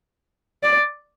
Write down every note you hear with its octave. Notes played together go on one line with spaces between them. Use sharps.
D5